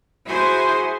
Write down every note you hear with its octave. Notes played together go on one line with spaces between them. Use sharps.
E4 F#4 G#4 C5 G#5 C6